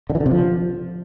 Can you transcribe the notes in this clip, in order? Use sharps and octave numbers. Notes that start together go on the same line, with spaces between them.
D3
E3
D3
C3
F3